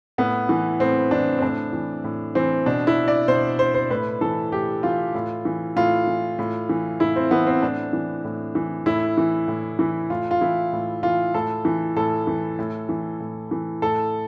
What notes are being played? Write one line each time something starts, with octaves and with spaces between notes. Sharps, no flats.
A2 B3
E3
A2 C4
E3 D4
C4
A2 D4
E3
A2
E3 C4
B2 D4
E4
D5
B2 C5
C5
C5
A2 B4
E3 A4
A2 G4
E3 F4
A2
E3
A2 F4
E3
A2
E3
A2 E4
C4
E3 B3
C4
A2 D4
E3
A2
E3
A2 E4
E3
A2
E3
A2 F4
F4
E3 E4
A2
E3 F4
A2 A4
E3
A2 A4
E3
A2
E3
A2
E3
A2 A4